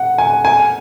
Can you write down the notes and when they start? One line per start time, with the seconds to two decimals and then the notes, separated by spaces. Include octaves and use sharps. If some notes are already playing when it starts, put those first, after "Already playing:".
Already playing: F#5
0.18 G#5
0.45 G#5